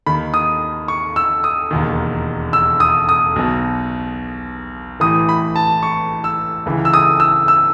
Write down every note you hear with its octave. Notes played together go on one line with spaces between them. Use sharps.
D#2 D#3 B5
D#6
C#6
E6
D#6
E1 D#2 D#3
E6
D#6
D#6
B1 B2
A1 A2 E3 D#6
B5
A5
C#6
E6
C#2 C#3 E3
E6
D#6
E6
E6